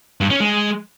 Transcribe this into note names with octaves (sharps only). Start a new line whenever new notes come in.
G2
C#4
G#3